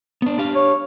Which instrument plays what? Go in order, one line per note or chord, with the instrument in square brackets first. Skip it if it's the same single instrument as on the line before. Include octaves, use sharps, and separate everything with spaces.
[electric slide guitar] B3 D4
D4 G4 F5
[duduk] C#5